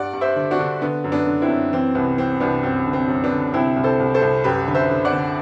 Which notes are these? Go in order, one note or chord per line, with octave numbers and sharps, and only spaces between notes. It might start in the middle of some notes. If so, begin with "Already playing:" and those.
Already playing: G2 D5 F#5
G2
C5 E5
D3
D4 F#4
D3
D3 B3
F#2
B3 D4
D3
C4 E4
F#2
E3 C4
C2 B3
E3 C4
C2 B3 D4
F#2 C4
D3
C4
F#2
B3 D4
D3
C2 C4 E4
C2
A4 C5
C2
A4 C5
C2
F#2 G4 B4
D3
C5 E5
D3
D5 F#5
D3